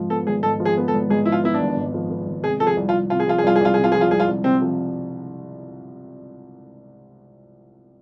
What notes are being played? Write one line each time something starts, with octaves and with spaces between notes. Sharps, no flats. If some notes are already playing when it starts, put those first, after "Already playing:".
Already playing: G#2 F3
B3 A4
G#1 G#4
G#2 A4
F3
G#4
B3
A4
G#1
G#2 G#4
F3 E4
F4
B3 E4
D4
G#1
G#2
F3
B3
G#1
C3 G#4
F3 A4
G#4
C2
F4
C2
C3 F4
G#4
F3 F4
G#4
C2 F4
G#4
C2 F4
C3 G#4
F4
F3 G#4
F4
C2 G#4
F4
C2
C3 C4
F3